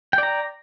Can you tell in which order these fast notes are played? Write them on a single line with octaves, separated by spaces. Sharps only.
G5 D5 A#5